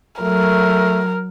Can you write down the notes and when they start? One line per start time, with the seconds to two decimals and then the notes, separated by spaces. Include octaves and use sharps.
0.22 F#3 A3 A#4